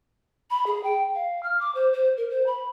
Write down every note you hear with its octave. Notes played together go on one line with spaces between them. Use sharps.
B5
G#4
G5
F5
F6
D6
C5
C5
A#4
C5
B5